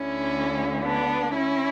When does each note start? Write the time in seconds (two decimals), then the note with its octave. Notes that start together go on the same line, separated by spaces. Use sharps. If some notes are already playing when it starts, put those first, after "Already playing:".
Already playing: D2 D3 C#4 E4
0.85 B3 D4
1.33 C#4 E4